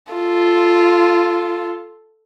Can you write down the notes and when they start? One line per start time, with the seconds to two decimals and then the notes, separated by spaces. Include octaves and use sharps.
0.13 F4 A4